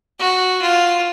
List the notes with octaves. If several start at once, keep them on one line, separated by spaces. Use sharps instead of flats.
F#4
F4